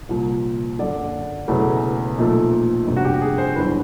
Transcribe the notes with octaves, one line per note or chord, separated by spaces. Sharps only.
C2 A#2 F3
F#1 F#2 D3 D5
E1 E2 C#3 F#3 A3
B1 A#2 F3 A3
G1 F2 C3
F#4
G4
G#4
C5
G1 F#2 C#3 E3 B4